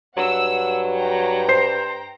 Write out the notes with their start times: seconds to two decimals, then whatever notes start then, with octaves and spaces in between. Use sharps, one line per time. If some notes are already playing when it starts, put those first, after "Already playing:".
0.17 G2 F#3 F#5 E6
0.97 G5 A#5
1.49 C5 C7